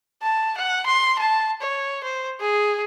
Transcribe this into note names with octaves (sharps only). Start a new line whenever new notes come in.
A5
F#5
C6
A5
C#5
C5
G#4